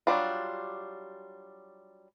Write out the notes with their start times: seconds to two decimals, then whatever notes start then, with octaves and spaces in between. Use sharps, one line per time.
0.07 F#3 G3 D4 F4